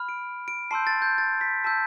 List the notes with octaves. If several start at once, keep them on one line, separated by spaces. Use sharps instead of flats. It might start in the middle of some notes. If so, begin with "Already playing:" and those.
Already playing: B5 F6
D7
D7
A5 C6 E6 G6 C7
A6
G6
A6
B6
A5 E6 G6 B6